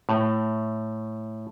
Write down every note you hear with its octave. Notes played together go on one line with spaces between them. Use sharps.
A2